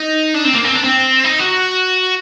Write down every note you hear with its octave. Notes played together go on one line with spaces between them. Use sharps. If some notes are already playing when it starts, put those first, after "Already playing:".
Already playing: D#4
D4
C4
A#3
C4
D4
C4
D#4
F#4